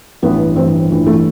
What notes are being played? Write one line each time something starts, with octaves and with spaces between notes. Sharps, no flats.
A1 G2 E3 B3
A1 G2 E3 C4
A1 G2 E3
A3